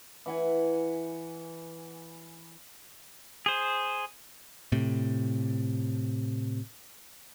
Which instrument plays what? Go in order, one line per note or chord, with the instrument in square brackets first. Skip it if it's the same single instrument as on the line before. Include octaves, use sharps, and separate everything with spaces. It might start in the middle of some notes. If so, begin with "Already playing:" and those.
[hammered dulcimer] E3 F#5 G#5
[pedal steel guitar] G#4 C5
[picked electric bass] A2 C3